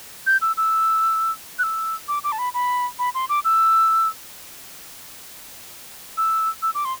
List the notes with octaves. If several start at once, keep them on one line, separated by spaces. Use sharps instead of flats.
G6
E6
E6
F#6
E6
D6
D6
A5
B5
B5
B5
C6
D6
E6
E6
E6
D6
C6